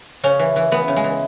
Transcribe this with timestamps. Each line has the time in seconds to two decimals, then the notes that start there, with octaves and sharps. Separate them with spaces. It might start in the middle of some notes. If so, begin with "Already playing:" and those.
0.24 C#3 C#4
0.39 E3
0.56 E3
0.71 E3 B3
0.88 C#3
0.96 G#3
1.04 E3